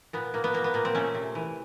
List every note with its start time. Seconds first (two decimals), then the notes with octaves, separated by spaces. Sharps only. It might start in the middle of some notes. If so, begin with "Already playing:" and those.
0.13 A#2 B3
0.34 A#2 A#3
0.44 B3
0.54 A#2 A#3
0.64 B3
0.74 A#2 A#3
0.85 C4
0.95 A3 C#4
1.15 C3
1.35 E3